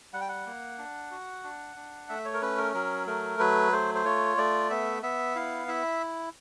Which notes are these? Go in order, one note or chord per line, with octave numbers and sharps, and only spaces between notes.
G3 F#5
G5
F#5
A#3
D4
F#4
D4
D4
A3 E5
C#5
A#4
C#4 B4
A#4
F#3 A#4
A3 A#4
F#3 B4
A3 C5
C5
F4 C#5
A3 D5
B3 E5
B3 E5
E4 F5
E4 E5